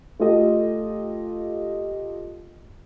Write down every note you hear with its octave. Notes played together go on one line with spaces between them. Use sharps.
A3 F4 G4 A4 D#5